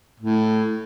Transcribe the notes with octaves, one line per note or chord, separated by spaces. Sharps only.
A2